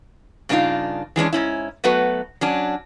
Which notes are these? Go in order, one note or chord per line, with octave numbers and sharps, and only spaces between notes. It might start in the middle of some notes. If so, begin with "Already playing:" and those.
G2 C#3 B3 D4 D#4 F4
E3 G#3 C#4 D4
G#2 C#4 E4
F#3 A3 B3 F#4 B4
F#3 C#4 D4